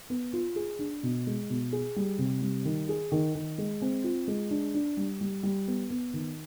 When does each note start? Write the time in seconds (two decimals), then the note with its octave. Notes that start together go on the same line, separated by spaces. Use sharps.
0.10 B3
0.33 F4
0.56 G#4
0.79 D4
1.03 B2
1.27 G#3
1.50 B2
1.73 G#4
1.96 G3
2.18 C3
2.41 G3
2.65 D#3
2.89 G#4
3.12 D#3
3.35 D#3
3.58 G#3
3.82 C4
4.04 F4
4.27 G#3
4.51 D4
4.74 D4
4.97 G3
5.21 G3
5.43 G3
5.67 B3
5.90 B3
6.13 D#3